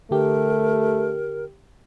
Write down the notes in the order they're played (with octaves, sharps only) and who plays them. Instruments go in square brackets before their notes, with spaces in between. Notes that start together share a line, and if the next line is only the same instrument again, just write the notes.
[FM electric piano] D3 G4 [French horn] A3 [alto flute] A#4